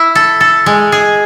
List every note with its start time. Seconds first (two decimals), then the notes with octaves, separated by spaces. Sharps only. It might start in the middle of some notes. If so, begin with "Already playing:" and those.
Already playing: E4
0.15 A4
0.41 A4
0.66 G#3
0.92 G#4